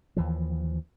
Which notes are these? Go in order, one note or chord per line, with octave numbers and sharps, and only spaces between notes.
D#2 E3 F3